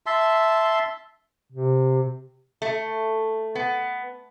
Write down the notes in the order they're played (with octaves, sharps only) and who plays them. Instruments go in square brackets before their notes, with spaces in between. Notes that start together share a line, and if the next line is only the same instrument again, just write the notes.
[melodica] E5 A5 C6
[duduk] C3
[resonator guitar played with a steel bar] A3
B3